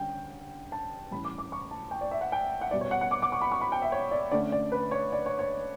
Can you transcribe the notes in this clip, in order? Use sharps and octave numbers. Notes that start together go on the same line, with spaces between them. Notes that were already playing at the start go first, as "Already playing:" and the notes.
Already playing: D3 G3 C#4 G5
A5
A2 E3 G3 C#4 B5
D6
D6
C#6
A5
G5
D5
E5
F#5
G5
F#5
B2 G3 B3 D5
C#5
F#5
F#5
D6
D6
C#6
B5
C#6
B5
G5
E5
C#5
D5
D3 A3 C#4 D5
D5
B4
C#5
D5
C#5
C#5